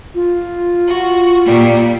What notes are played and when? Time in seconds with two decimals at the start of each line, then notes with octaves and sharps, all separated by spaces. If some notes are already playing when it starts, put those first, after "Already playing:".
0.15 F4
0.89 F#4
1.46 A#2 G3